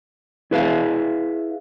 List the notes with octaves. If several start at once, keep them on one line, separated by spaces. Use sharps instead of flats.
E4 G#4 B4 E5 F5